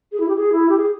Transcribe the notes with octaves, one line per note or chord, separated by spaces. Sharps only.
G#4
E4
G4
G#4
E4
G4
G#4